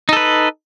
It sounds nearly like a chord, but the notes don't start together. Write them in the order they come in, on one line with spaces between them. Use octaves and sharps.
D#4 A4 B4